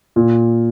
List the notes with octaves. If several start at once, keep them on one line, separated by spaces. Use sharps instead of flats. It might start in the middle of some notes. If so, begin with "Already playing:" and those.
A#2